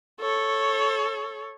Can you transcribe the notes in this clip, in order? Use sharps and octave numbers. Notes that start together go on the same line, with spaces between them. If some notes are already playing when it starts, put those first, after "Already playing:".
A4 C#5